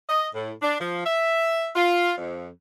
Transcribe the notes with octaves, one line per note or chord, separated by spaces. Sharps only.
D#5
A2
D4
F3
E5
F4
F2